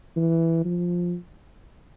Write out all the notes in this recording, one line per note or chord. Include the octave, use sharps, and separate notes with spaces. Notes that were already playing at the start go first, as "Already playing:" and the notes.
E3
F3